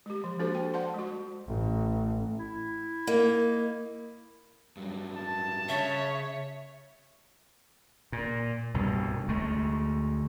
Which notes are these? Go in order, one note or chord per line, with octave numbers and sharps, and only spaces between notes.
G#3 G4
F3
A#3 D4 F#4 G4 A4 C5
C5 G5
C5 D5 F#5 A5 C6
G#3 F#4
A1
E4
A#3 D#4
G2 F#3
A5
C#3 C#5 E5
A#2
C2 G2 B2
D2 G#3 A3